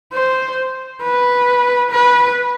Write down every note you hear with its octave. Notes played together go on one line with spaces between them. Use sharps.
C5
B4
B4